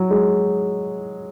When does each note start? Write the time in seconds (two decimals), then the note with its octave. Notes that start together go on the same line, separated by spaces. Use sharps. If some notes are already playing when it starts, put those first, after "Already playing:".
Already playing: F#3
0.11 G#3